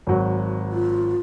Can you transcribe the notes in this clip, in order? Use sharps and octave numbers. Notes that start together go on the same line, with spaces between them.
G#1 F#3
F4